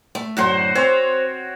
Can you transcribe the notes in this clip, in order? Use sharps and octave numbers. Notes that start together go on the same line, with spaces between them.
A3
F#2 A2 D3 F#4 C5
C4 C5 C#5